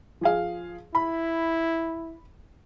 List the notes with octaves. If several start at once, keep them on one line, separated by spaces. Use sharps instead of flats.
F3 G#4 F5
E4 B5